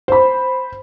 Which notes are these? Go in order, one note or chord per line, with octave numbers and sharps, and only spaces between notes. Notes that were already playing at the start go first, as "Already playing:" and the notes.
C5 B5